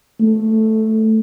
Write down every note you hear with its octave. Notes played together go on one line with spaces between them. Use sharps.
A3